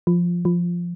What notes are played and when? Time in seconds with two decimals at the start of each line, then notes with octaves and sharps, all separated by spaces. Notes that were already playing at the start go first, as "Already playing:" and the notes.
0.07 F3
0.45 F3